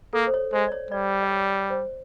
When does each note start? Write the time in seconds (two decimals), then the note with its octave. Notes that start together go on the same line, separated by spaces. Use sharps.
0.13 A#3 A4
0.27 C5
0.34 C#5
0.53 G#3 C5
0.68 D5
0.72 C#5
0.91 G3 D5
1.23 D5
1.31 C#5
1.70 C5